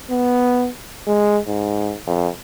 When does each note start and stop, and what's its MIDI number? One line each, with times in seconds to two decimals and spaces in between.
0.11 0.69 59
1.07 1.40 56
1.47 1.96 44
2.07 2.28 41